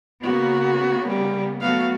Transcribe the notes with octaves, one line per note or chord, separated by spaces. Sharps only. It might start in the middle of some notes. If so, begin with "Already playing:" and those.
C#3 A#3 B3 F#4
G3
F#3 A3 B3 F#4 F5